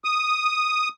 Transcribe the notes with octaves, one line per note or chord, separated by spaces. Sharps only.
D#6